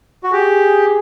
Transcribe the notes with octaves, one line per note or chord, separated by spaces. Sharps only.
F#4
G4 G#4